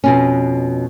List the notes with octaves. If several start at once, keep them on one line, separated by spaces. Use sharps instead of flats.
F2 B2 C#4